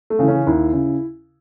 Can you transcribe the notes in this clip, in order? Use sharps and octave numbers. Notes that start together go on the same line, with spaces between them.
A3
C#3 E3
C#4
D#2 E4
C#3